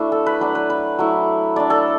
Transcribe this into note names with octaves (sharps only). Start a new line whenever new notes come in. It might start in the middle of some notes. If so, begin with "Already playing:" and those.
Already playing: A3 D4 E4 F#4
A4
B4
F#3 D4 B4
B4
B4
F#3 A3 E4
A3 D4 D5
A4